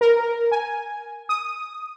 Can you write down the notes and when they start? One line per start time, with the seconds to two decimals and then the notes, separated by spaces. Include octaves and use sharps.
0.01 A#4
0.52 G#5
1.29 D#6